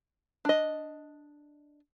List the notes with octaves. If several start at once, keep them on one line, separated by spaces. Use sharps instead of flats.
D4 D#5